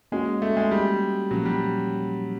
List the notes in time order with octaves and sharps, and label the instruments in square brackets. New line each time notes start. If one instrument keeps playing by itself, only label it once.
[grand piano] G#3 [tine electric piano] A#3 C#4 F#4
[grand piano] A3
G#3
G3
[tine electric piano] A#2 F3 A#3 C#4 [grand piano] F#3
[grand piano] G3